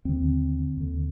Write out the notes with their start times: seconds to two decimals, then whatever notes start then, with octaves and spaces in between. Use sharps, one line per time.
0.05 D#2 D3 C4
0.77 D#2 D3